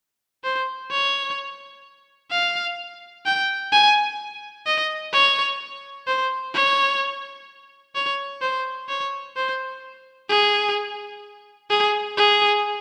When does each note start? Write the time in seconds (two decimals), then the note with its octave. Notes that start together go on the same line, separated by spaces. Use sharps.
0.44 C5
0.91 C#5
2.31 F5
3.26 G5
3.72 G#5
4.66 D#5
5.13 C#5
6.07 C5
6.54 C#5
7.95 C#5
8.42 C5
8.89 C#5
9.36 C5
10.29 G#4
11.70 G#4
12.17 G#4